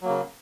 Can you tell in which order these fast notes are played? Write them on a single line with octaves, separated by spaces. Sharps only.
F#3 A#3 C#3